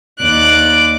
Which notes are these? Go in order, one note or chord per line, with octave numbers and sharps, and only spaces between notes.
D#2 D5 D6 F#6